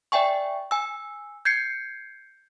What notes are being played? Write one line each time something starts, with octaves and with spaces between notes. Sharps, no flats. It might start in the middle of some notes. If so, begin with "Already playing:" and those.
D5 E5 G5 G#5 C#6
G#5 E6
G6 G#6 C7 C#7